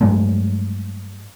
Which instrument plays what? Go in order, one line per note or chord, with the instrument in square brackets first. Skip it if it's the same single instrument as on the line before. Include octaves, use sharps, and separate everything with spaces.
[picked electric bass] G2 F#3 G#3 A3